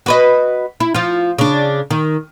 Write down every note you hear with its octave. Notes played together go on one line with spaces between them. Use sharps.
F#4 B4 D#5
E4
F3 F4
C#3 D4
D#3